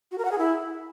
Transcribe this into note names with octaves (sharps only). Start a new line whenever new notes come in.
F#4
A#4
F#5
G#4
E4